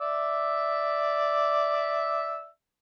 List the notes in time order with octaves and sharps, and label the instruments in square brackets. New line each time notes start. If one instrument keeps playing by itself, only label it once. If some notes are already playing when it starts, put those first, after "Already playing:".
[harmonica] D5 E5 E6